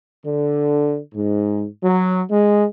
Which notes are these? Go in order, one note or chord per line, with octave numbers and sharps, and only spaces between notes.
D3
G#2
F#3
G#3